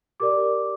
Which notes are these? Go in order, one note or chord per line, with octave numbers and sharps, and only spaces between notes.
G4 A#4 D5 D6